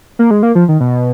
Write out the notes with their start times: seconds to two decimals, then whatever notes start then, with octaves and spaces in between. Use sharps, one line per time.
0.19 A#3
0.31 G#3
0.43 A#3
0.55 F3
0.69 D#3
0.80 B2